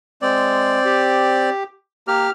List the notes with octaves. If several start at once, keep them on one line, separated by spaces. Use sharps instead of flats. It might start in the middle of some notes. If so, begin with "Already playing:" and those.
G#3 C4 D5
G4
A#3 G4 F6